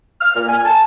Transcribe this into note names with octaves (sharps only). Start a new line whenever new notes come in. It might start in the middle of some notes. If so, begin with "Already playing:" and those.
F6
A#2
G#5
A5